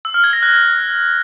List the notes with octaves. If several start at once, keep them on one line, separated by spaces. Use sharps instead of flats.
E6
F6
G#6
A#6
F#6